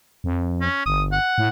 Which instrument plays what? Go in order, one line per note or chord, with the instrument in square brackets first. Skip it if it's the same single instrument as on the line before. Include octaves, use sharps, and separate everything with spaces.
[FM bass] F2
[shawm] C#4
[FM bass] G1 [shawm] D#6
[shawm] F#5
[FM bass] A2